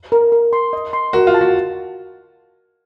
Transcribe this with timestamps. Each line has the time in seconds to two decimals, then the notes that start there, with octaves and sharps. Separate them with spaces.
0.12 A#4
0.32 A#4
0.53 C6
0.73 D#5
0.93 C6
1.13 F#4 A#4
1.27 F4
1.34 A5
1.41 F#4